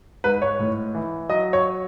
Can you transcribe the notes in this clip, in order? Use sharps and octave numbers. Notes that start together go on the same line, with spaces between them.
G#2 B4
C#5
A2
E3
F#3 D#5
C#5